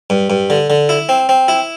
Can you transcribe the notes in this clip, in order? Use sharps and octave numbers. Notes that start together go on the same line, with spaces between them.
G2
G2
D3
D3
E4
C4
C4
E4